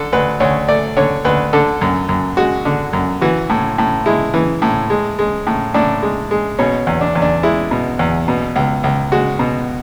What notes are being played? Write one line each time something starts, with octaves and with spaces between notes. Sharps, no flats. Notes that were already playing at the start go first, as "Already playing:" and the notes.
Already playing: D3 A4
D2 B4
D2 C#5
A3 D5
D3 C#5
D2 B4
D3 A4
F#2
F#2
G#3 F#4
D3
F#2
E3 F#4
A2
A2
G#3 E4
E3
A2
G#3
G#3
A2
A2 D4
G#3
G#3
B2 C#4
E2
D4
E2
D4
G#3 E4
B2
E2
B2
C#2
C#2
G#3 F#4
B2